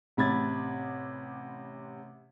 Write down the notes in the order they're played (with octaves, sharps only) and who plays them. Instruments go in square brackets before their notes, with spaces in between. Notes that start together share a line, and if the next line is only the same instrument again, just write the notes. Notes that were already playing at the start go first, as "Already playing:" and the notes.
[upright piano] A1 C3 B5 G#6 A6